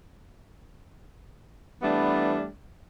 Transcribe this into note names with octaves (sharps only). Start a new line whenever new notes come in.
E3 G3 A3 B3 D4